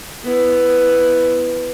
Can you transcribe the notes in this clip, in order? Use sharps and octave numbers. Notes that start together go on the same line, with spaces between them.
B3 E4